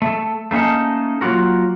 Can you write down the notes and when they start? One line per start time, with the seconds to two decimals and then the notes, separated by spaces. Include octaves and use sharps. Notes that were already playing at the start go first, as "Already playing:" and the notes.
0.02 A3 A4
0.51 A3 A#3 C#4 D#4 A4
1.21 F#3 A#3 F4 F#4 A#4